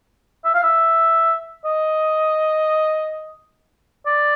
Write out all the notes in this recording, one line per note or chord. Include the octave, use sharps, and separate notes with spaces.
E5
F5
E5
D#5
D5